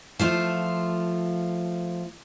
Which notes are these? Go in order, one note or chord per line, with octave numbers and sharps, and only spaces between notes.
F3 A3 F4